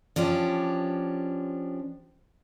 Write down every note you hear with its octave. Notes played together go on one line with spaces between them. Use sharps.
F3 C#4 D4 G4